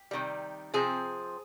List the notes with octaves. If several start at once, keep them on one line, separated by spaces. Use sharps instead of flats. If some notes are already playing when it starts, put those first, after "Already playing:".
Already playing: G4
C3 D#3 G3
C3 F3 C4 G#4